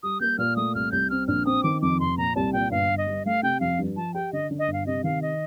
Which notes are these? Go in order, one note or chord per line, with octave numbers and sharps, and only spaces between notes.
G3 D#6
A#3 G6
A#2 F6
A3 D#6
C2 F6
C2 G6
C4 F6
A#1 F6
C4 D#6
D#3 D6
F2 D6
F1 C6
A#2 A#5
C2 A5
A#2 G5
G1 F5
G1
D#5
G2
A3 F5
C3 G5
F2 F5
G2
F3 A5
G4 G5
D3 D#5
D3
D#5
G1
F5
C3 D#5
D#3 F5
D#5